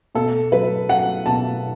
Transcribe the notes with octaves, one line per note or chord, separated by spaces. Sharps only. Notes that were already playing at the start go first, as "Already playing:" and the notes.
B2 A4
F#3 B4
F#3 F#5
B2 A5